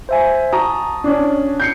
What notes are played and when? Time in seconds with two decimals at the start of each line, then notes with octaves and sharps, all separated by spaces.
0.09 C5 E5 G#5
0.53 F#4 A5 A#5 D#6
1.04 C#4 D4
1.60 G6 C7 C#7